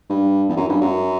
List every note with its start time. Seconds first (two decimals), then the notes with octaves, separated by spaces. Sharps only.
0.09 G2
0.49 E2
0.56 F#2
0.69 G2
0.81 F#2